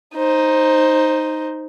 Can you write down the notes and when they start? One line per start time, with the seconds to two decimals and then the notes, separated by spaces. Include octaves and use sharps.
0.16 D#4 C5